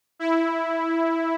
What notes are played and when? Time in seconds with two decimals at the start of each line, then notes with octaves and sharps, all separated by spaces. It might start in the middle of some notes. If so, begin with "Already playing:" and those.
0.19 E4